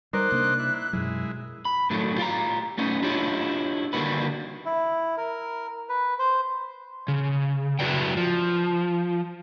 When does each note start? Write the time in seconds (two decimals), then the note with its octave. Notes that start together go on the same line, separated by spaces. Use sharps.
0.13 G3 D#4 A#4 C5 D5 F#6
0.32 C3 A#3 D4
0.59 E4
0.93 F#2 B2 F#3 G#3 E4
1.65 B5
1.90 A2 D#3 F#3 A3
2.18 F4 G4 A#5
2.78 A3 B3 C#4 D#4
3.02 D4 E4 F4 G4 C#5 D#5
3.93 D3 D#3 G3 A#3 F#4 B4
4.65 E4
5.18 A#4
5.89 B4
6.19 C5
7.08 C#3
7.79 F#2 E4 F#4 B4 D5 G5
8.17 F3